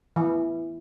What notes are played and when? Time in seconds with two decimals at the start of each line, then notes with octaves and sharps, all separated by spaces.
0.16 E3